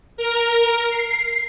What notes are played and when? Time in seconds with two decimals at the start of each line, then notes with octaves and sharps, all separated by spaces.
0.17 A#4
0.90 C7